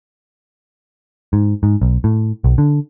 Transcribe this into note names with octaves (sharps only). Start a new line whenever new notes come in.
G#2
G#2
B1
A2
B1
D3